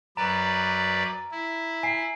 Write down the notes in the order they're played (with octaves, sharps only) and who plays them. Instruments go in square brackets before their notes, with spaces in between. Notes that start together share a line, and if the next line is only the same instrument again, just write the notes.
[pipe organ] F#2 B4 D5 [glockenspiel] A#5
[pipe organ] E4
[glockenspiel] G#5 C7